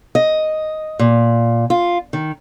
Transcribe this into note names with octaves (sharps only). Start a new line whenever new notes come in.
D#5
A#2
F4
D#3